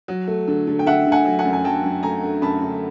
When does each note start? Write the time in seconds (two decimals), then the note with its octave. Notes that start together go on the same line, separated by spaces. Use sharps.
0.08 F#3
0.28 A3
0.48 D3
0.67 D3
0.79 G5
0.86 D3 E5 F#5
1.07 D3
1.12 F#5 G#5
1.25 F#3
1.39 F#5 G#5
1.45 F#2
1.53 G#5
1.64 F#3 G5 A5
1.83 F#2
2.03 A3 G#5 A#5
2.23 A3
2.42 F#2 A5 B5
2.62 D3